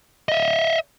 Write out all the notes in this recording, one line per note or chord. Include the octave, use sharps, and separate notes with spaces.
D#5 E5